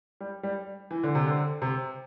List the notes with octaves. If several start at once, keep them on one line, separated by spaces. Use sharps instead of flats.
G3
G3
E3
D3
C3
D3
C3